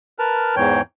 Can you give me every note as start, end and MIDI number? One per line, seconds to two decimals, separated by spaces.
0.19 0.55 70
0.19 0.55 71
0.19 0.55 81
0.19 0.55 89
0.56 0.81 40
0.56 0.81 44
0.56 0.81 52
0.56 0.81 73
0.56 0.81 79